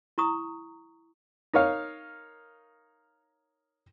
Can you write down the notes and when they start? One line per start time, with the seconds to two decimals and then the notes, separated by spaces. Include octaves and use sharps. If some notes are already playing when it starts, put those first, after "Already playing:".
0.18 E4 A#5 C#6 D#6
1.53 D#4 A#4 C#5 F5